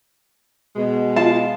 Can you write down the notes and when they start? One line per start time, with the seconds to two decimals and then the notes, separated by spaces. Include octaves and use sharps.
0.76 B2 G#3
1.16 F4 F5 A5